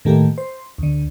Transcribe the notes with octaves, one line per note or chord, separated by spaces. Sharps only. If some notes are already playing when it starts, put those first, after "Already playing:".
A2 D#3 A3 A#3 G4
C5
D2 D3